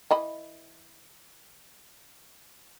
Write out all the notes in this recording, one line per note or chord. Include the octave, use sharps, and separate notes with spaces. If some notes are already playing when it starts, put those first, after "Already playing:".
E3 D#5 B5